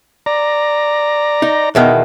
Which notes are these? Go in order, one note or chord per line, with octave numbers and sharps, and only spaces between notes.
D5 A#5
D#4
E2 B2 D#3